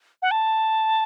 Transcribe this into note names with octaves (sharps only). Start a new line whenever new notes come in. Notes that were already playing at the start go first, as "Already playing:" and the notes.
F#5
A5